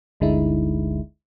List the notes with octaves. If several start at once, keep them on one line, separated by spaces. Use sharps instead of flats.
G1 D2 D3 G#3 D#4 E4